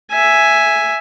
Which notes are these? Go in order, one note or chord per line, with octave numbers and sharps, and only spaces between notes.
E5 G#5